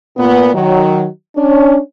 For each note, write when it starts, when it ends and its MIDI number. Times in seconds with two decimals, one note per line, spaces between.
0.17 0.54 46
0.17 0.54 59
0.55 1.05 51
0.55 1.05 54
1.37 1.78 61
1.37 1.78 62